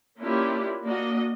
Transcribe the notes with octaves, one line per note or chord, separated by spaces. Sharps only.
A#3 C#4 D4 E4 F4 G4
A#3 D4 F#4 D#5